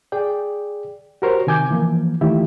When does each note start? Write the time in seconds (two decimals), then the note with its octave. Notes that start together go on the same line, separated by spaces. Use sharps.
0.12 G#4 D5 G5
1.22 F#4 G4 A#4 C5 C#5
1.47 C3 D#3 G#5 D6 G6 G#6
1.70 E3 F3 A#3
2.21 D#3 E3 A3 E4 F4 G4